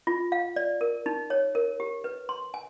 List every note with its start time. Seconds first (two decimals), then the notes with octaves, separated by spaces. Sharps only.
0.07 F4
0.32 F5
0.56 D5
0.81 A#4
1.06 D#4
1.30 C#5
1.55 A#4
1.80 G4
2.04 B4
2.29 C6
2.54 G#5